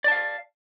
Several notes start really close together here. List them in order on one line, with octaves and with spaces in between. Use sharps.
D5 A5 F5